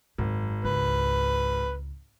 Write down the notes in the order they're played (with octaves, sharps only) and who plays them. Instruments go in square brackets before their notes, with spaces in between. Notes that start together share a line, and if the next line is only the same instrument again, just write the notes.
[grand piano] G#1 [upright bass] F#2
[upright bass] C#2 [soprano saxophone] B4